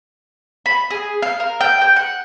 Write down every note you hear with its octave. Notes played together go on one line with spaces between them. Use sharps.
B5
G#4
F5
A#4
G5
G5
F#5